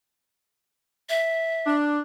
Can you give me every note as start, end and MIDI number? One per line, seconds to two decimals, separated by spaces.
1.10 1.75 76
1.66 2.00 62